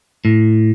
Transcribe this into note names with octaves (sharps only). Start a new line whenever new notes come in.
A2